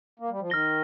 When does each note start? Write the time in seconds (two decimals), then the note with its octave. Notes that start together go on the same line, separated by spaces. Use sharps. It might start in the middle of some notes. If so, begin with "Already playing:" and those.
0.19 A#3
0.30 G3
0.40 F3
0.49 D#3 F6 A#6 G7